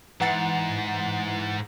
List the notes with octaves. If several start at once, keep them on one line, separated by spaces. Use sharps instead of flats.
G#2 E3 F#5 A6